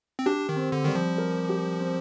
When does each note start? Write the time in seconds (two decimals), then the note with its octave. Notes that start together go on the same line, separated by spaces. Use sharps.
0.19 C4
0.26 D4 G4
0.49 D#3
0.56 C4
0.72 D3
0.85 D#3 G3
0.95 F3
1.18 A#4
1.49 G4
1.80 C4